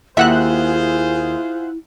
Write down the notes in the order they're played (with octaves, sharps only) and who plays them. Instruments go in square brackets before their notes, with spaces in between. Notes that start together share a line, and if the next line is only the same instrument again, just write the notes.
[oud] D#2 [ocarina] E4 [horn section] F4 G#4 C5 [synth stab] E5 F#5 F#6